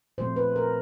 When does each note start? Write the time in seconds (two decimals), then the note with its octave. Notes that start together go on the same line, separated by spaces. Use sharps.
0.18 A#2 F3 A3 C4 C5
0.36 B4
0.56 A#4